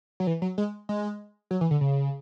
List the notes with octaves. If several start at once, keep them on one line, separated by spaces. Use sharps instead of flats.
F#3
E3
F#3
G#3
G#3
F#3
E3
D3
C#3